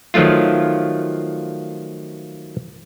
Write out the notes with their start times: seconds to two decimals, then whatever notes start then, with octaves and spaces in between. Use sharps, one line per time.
0.14 D#3 F3 F#3 A3 F4